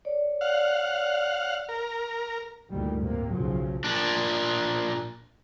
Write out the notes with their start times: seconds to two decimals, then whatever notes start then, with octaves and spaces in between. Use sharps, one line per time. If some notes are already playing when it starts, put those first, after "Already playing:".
0.05 C#5 D5
0.41 F5 F#5
1.69 A#4
2.70 D2 G2 A#2 D#3 G3
3.00 A2 C3 A#3
3.30 B1 C#3 F3 F#3
3.84 A#2 D4